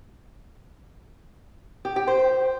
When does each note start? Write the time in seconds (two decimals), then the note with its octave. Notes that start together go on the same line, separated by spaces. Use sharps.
1.85 G4
1.96 G4
2.07 C5